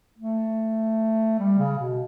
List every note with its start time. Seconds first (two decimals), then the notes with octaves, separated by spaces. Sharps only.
0.18 A3
1.39 G3
1.58 C#3
1.79 B2